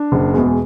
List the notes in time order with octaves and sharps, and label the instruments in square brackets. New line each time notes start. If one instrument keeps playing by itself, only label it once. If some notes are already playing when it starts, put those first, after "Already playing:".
Already playing: [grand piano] D4
F#1
E2 B2 G#3